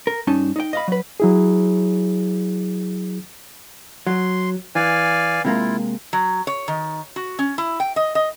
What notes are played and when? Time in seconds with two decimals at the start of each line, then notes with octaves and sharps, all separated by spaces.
0.07 A#4
0.27 G2 C#4 D#4 A5
0.56 D#4 G5
0.73 D#5 F5 B5
0.88 F#3 B4
1.20 F#3 E4 G#4
4.07 F#3 C6
4.75 E3 D5 F5 G#5
5.45 C3 G#3 A#3 E4 F4
6.13 F#3
6.47 C#5
6.68 D#3
7.16 F#4
7.39 C#4
7.58 E4
7.80 G5
7.96 D#5
8.15 D#5